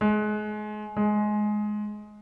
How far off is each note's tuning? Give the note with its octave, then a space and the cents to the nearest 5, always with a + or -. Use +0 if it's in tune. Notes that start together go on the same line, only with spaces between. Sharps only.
G#3 +30
G#3 +15